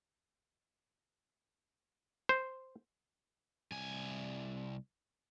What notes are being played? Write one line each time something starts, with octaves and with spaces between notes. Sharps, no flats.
C5
C2 G#5